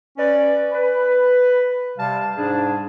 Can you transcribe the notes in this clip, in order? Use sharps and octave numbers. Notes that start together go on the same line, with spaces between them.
C#4 B4 D5
B4
C3 G3 F5 A5
G#2 G3 D4 G#4